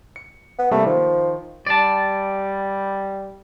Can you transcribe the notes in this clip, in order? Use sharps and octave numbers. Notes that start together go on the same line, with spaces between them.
C#7
B3
C3 G3 A3 A#3
D#3 F3
G3 D5 A5